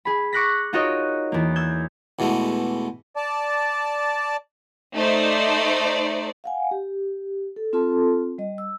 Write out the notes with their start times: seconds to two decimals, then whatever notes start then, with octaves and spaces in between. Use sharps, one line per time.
0.05 G#4 B5
0.33 C#6 D6 F#6 A#6 B6
0.73 D#4 F4 F#4 A#4 C#5 D#5
1.32 E2 A#3
1.56 E6 G6 G#6
2.19 E2 B2 E3 G#3 A3
3.16 D5 A5
4.95 A3 D#4 C5 D5
6.44 F5 F#5 G#5
6.71 G4
7.56 A4
7.73 C4 F4 A4 A5 C6
8.38 G3 D#5
8.58 E6